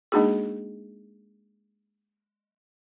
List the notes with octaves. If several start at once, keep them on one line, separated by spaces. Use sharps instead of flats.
G#3 A#3 D4 D#4 F#4 G#4